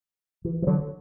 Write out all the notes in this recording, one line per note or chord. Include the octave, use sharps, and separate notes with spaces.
E3
E3
D3 F#3